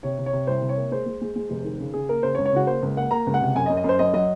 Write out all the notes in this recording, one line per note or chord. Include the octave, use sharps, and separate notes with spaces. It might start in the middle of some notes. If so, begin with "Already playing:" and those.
C3 C#5
C3
C#5
C3
C2 C5
C3
C#5
A#3
G#3 C5
G#3
G#3
G#3
F1
D#3
C#3
C#3 G#4
A#3 A#4
C#3 C5
C#5
C#2
C#5
C#3 F#4
A#3 C5
C#2
A#3 F#5
A#3 A#5
C#2
F#5
C3
F#2 G#5
D#5
F#2
D#5
F#2 C5
F#2 D#5
F#3 D#5